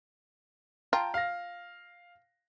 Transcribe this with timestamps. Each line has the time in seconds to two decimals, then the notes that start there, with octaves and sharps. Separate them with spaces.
0.93 F4 G5 A5 A#5
1.14 F5 A#6